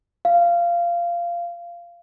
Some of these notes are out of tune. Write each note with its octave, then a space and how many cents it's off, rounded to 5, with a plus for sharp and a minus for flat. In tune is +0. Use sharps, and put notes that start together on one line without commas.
F5 -15